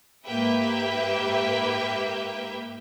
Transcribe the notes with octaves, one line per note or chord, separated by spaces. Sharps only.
G#2 A#3 G4 B4 E5 G5